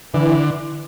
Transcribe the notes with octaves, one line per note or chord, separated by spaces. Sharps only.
D3 E3